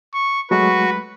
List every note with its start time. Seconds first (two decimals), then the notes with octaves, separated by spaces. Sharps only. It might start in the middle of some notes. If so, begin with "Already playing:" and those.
0.14 C#6
0.51 F#3 G#3 A3 F#4 B4 C#6